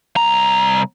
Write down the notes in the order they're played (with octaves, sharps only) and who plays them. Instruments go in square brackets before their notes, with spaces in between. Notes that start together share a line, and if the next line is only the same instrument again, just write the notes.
[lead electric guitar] C2 A#5